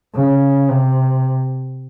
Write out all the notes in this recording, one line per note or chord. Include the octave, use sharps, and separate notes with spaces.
C#3
C3